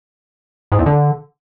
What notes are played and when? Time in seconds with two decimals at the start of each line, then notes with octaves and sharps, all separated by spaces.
0.72 G#2
0.79 E2
0.86 D3